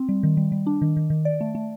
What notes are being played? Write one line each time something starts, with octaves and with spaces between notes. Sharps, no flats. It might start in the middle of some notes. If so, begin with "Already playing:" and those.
Already playing: C4
G3
D#3
G3
G3
D4
D#3
D#3
D#3
D5
A3
A3